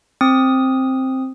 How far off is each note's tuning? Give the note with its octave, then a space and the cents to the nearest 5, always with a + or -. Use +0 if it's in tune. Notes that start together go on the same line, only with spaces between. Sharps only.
C4 +10 D#6 +0